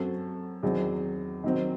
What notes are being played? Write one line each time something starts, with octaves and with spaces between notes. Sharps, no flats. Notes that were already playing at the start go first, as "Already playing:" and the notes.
Already playing: F#2 F#3 C4 F#4 A4
E2 D#3 F#3 C4
D#3 F#3 C4